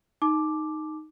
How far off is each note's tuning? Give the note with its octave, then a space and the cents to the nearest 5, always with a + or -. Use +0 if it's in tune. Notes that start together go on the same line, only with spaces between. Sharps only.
D#4 +0 A5 -35 D6 +0